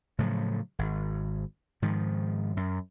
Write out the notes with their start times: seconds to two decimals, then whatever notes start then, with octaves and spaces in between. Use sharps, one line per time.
0.19 A2 C#3 F3 F#3
0.79 G#1
1.82 G#2 D#3 F3
2.57 F#2